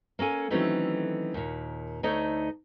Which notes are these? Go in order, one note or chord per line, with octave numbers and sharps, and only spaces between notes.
A#3 C#4 A4 G#5
D#3 E3 F#3 A3 C4 C#4
D#2 A#2
D2 A3 D#4 C#5 D#5